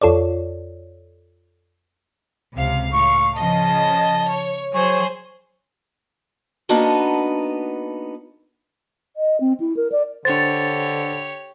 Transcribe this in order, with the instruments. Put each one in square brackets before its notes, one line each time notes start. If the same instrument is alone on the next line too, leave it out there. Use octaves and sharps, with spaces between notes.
[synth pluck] F2 F4 A4 C#5 D5
[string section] C#2 C3 F5
[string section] A2 F5 [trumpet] C#6
[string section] C#3 F3 D#5 [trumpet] A5
[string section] C#5
[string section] F#3 G#4 C5 [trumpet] C#5
[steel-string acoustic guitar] A#3 B3 D4 D#4 F#4 A4
[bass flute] D#5
C4
E4
A#4
D5
[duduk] D3 [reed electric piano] D4 C5 [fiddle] G4 C#5 [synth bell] A6